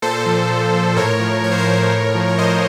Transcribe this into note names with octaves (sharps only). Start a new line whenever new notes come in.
A#2 A4 C5
F3
A#2
F3
A2 A#4 C#5
F3
A2 C#5
C5
A#4 C#5
F3
A2
F3
C#5
A2 C5 D#5